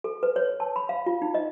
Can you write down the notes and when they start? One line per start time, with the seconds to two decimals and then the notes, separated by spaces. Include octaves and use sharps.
0.04 A4
0.23 B4
0.36 C#5
0.60 A5
0.76 B5
0.89 F5
1.06 F4
1.22 D#4
1.34 D#5